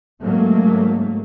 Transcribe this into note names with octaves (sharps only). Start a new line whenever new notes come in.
G#2 C#3 F#3 A3 A#3